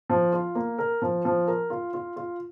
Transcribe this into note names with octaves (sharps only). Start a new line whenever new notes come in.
F3
F4
A#3
A#4
F3
F3
A#4
F4
F4
F4